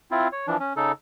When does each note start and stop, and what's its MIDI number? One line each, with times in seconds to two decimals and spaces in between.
0.11 0.28 60
0.11 0.28 64
0.11 0.28 65
0.32 0.47 73
0.47 0.57 52
0.47 0.57 53
0.47 0.57 62
0.60 0.73 61
0.76 0.92 49
0.76 0.92 63
0.76 0.92 69